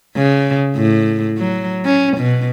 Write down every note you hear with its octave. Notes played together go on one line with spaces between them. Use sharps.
C#3
A2
F#3
C#4
B2